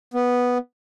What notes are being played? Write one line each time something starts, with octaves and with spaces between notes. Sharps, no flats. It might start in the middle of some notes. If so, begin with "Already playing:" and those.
B3